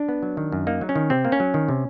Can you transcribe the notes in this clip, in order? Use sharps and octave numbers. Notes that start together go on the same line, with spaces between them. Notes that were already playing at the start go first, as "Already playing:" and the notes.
Already playing: D4
B3
F#3
D#3
F#2
A#3 D#4
F#3
C#4
D#3
C3 C4
A#3
C#4
F#3
D#3
C3